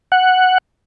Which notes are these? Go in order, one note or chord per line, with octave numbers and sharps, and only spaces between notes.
F#5